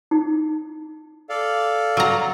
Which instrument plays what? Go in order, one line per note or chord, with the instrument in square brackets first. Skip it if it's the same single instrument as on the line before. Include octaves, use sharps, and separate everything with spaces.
[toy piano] D#4
[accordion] A4 D5 F5
[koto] F#3 A#5